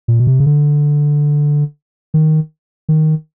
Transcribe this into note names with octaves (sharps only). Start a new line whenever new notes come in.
A#2
B2
C3
C#3
D3
D#3
D#3